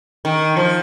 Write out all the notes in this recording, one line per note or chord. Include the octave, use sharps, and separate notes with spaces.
D#3
F3